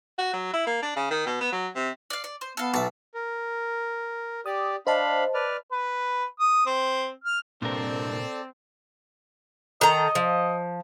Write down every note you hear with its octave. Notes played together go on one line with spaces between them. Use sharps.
F#4
F#3
E4
A#3
D4
C#3
D#3
B2
B3
F#3
C3
D5 F5
D5
C5
B3 A4 F5
B1 E5 A5
A#4
G4 D5 D#6
D4 C5 D#5 F5 A5 B5
B4 D5 F6
B4
D#6
C4
F6
C2 G2 A#2 C4 A4 A#4 D5 A5
D#3 A4 D#5 A#5
F3